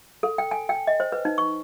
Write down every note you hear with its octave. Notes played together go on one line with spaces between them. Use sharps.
A4
G5
G#5
G5
D#5
C5
B4
D#4
C#6